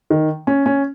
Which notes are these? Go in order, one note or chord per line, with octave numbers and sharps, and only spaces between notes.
D#3
C#4
C#4